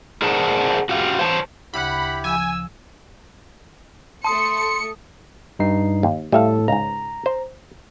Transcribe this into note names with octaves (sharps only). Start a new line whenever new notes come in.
G#4 A#4 C5 D5 F#5 A5
F#4 G4 F5
C5 C#5 A5
D2 C#3 E4 G4 F#5 B5
F3 G#5 E6
A3 A5 C6 D#6 C#7
G2 D#4 C7
D#2
A2 G3 A4 E5 F5
C#2 G#2 A#5
C5